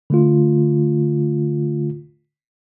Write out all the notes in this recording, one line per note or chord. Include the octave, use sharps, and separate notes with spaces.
D3 A3 F4